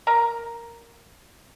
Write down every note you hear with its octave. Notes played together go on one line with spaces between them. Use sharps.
A#4 A#5